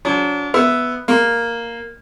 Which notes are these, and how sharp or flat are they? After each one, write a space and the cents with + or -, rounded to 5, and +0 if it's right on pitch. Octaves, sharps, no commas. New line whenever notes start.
F#3 -25 D4 -35
B3 +0 E5 +0
A#3 +0 C6 +0